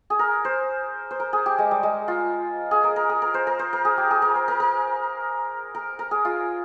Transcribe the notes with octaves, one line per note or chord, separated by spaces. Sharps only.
G#4
A#4
C5
C5
A#4
G#4
G4
G#3
G3
G#3
F4
G#4
A#4
A#4
G#4
A#4
C5
A#4
C5
A#4
G#4
G4
G#4
A#4
C5
A#4
A#4
A#4
A#4
G#4
F4